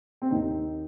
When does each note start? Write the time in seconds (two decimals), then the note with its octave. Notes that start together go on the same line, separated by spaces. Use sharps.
0.22 C4
0.31 D#2 D#3 D#4